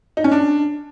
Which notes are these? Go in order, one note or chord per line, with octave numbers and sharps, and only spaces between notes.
D#4
C#4
D4